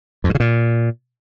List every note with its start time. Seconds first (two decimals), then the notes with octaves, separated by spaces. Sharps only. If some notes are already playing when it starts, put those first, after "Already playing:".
0.24 F2
0.29 G2
0.35 C#3
0.40 A#2